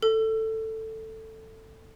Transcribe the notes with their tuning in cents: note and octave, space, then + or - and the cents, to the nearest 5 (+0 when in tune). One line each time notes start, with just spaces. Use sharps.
A4 +10